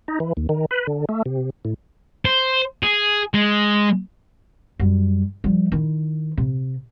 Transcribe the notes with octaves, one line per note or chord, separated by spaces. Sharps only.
D#4
E3
D#2
D#3
B4
D3
A3
C3
A2
C5
G#4
G#3
F#2 G3
F3 G3
D#3 E4
C3